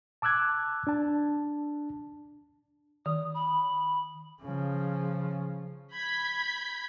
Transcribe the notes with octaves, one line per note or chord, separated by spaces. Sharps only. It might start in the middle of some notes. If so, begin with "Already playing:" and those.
A5 D6 E6 F#6 G#6
D4 A5
D#3 D#6
B5
C#3 F3
B5 G6 G#6 B6